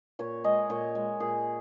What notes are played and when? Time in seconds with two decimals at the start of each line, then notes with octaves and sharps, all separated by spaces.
0.19 A#2 C#5
0.44 G#3 D#5
0.70 A#2 C#5
0.95 G#3
1.20 A#2 G#4